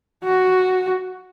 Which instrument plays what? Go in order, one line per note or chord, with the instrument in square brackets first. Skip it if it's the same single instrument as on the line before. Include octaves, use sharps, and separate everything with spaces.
[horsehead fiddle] F#4